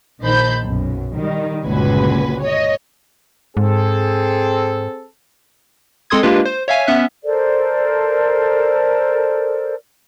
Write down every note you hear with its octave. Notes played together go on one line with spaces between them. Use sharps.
A#1 D#3 C5 A5 B5 G6
B1 F#2
D#3 G3
G1 C#2 A#2 F#4 B4 G#5
C#5 D#5
G#2 C4 G#4 A4
G#3 C4 A4 C6 D#6 G#6
G#3 A#3 D4 F4 G4 B4
C5
C#5 E5 F5 G#5
B3 C#4 E5 F#6
A4 A#4 C5 D5